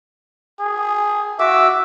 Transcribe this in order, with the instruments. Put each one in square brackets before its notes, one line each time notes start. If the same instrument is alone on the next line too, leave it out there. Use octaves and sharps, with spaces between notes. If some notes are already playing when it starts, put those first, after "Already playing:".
[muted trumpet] G#4
[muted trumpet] F#4 [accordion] E5 D6 E6